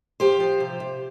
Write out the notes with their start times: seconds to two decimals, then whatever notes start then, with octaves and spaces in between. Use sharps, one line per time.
0.20 F3 G4 C5
0.40 F3
0.60 C3
0.80 C3